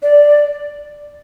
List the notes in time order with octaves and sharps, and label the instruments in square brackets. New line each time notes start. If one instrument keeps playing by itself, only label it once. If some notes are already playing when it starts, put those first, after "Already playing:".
[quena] D5